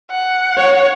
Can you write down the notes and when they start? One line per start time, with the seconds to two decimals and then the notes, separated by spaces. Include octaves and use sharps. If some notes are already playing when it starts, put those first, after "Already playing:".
0.11 F#5
0.57 C#5